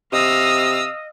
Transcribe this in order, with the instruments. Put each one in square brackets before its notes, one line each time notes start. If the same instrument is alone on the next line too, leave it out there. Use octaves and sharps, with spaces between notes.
[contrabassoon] C3 [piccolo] D#5 [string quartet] F5 D#6 E6